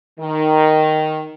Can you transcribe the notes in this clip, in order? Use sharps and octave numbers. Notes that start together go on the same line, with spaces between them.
D#3